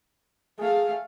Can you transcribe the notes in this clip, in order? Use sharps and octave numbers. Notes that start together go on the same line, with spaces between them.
A3 G#4 F5